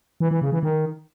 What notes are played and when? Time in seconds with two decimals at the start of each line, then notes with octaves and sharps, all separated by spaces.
0.20 E3
0.31 E3
0.42 C#3
0.52 E3
0.63 D#3